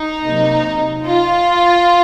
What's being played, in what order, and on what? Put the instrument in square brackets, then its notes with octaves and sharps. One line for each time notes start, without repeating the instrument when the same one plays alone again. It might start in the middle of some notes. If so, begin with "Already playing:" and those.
Already playing: [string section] D#4
C3 F#3 A#3
F4